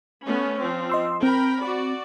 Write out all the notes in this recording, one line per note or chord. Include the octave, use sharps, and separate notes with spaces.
A3 B3 C#4
F3 C4
D#5 C6 E6
C4 A#4 G5 B5
F#4 D5